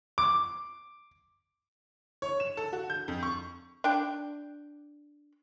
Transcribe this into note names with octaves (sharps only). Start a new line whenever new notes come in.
D6
C#5
E7
A4
F#4
G6
F2
C#6
D4 G5